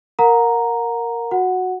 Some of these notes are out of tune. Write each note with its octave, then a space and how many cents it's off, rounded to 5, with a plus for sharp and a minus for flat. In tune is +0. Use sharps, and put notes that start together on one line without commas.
A#4 +0 F#5 -35 A#5 +0
F#4 -10 F#5 +0